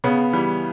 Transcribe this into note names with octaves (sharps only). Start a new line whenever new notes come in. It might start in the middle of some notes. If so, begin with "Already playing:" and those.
C#3 B3
E3 G3